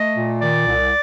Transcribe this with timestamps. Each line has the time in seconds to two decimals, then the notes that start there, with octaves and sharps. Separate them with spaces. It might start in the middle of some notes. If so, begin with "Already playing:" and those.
Already playing: A3 D#5
0.15 A#2
0.41 D#3 D5
0.68 C2